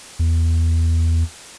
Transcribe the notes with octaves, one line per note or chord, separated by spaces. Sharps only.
E2